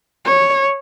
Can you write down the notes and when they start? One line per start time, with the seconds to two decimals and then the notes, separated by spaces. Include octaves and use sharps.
0.25 C#5